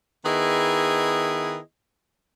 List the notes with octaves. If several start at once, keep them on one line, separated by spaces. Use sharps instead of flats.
D#3 B3 E4 G#4 B4 D#5